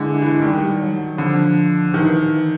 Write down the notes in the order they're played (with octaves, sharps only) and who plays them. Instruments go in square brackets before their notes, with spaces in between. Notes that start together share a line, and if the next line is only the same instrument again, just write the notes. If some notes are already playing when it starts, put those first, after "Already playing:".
Already playing: [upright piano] D3 E3 [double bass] G#3
[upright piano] E3
[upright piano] D#3 [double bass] G3
[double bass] F#3
[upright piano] D3 [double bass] F3
[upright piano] D#3 [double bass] E3